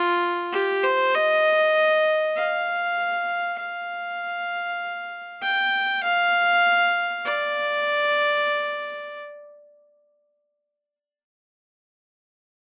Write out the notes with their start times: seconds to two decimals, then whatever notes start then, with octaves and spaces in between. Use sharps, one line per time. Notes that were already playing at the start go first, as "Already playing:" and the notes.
Already playing: F4
0.53 G4
0.83 C5
1.14 D#5
2.36 F5
3.58 F5
5.42 G5
6.03 F5
7.25 D5